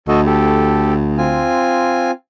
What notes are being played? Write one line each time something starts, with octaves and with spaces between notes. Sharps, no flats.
D2 F#4 A4 D#5
G4 A4
C4 F4 G#5